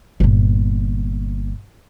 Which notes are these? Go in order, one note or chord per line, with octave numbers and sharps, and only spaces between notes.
G1 A#2